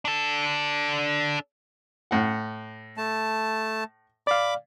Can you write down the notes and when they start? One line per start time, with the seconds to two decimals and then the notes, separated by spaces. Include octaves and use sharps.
0.05 D4 A4
2.11 A2 F#5
2.97 A3 A5
4.27 D5 F5 B5 D6